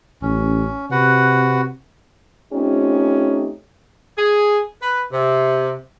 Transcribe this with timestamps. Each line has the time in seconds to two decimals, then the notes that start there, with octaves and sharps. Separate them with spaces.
0.22 A1 C#4
0.91 C3 F#4 B4 F#5
2.53 A3 C4 C#4 D#4 F4 G4
4.18 G#4
4.81 B4
5.12 C3